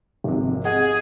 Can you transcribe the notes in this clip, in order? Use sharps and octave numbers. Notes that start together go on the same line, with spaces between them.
G#1 F2 C3
G#4 D#5 F#5